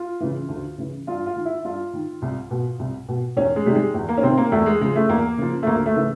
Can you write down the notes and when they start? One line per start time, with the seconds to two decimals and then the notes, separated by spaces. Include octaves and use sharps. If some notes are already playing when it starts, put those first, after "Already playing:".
Already playing: F4
0.20 C#3 E3
0.49 D2
0.78 C#3 E3
1.07 G2 F4
1.26 F4
1.36 D#3
1.45 E4
1.65 G2 F4
1.94 D#3
2.22 C2
2.51 B2
2.79 C2
3.09 B2
3.37 E2 C#4
3.56 G#3
3.66 C3 D#3 G3
3.75 G#3
3.94 E2
4.09 A#3
4.18 C#4
4.23 C3 D#3 C4
4.38 A#3
4.52 E2 A3
4.66 G#3
4.81 C#3 F3 G#3
4.96 A3
5.09 E2 A#3
5.38 C#3 F3
5.63 A3
5.67 D2 A#3
5.86 A3
5.96 C#3 E3